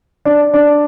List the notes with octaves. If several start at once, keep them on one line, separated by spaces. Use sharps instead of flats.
D4
D4